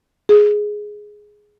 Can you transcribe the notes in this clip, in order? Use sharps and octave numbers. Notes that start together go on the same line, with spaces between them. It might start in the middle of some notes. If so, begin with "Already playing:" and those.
G#4